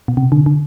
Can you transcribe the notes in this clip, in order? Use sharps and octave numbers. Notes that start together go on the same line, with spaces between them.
B2
C3
D3
D3